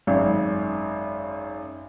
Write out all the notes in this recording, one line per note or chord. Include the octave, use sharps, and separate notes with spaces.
G#1 F#2